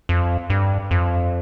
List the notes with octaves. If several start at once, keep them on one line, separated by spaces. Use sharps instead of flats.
F2
G2
F2